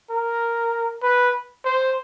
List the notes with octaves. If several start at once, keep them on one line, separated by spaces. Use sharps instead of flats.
A#4
B4
C5